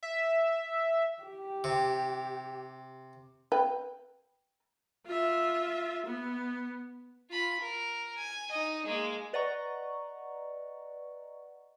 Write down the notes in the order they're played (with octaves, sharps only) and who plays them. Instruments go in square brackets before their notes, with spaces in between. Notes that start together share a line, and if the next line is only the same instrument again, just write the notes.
[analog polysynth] E5
[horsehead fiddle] G4
[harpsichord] C3
[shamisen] B4 G5
[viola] F4 E5
B3
[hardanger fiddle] F4 B5
A#4
G#5
D#4 D#5
G#3 A#3
[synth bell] B4 D5 D#5 F#5 A#5 C#6